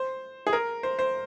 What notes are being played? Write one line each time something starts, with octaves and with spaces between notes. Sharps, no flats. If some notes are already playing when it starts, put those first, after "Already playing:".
Already playing: C5
G#4
A#4
C5
C5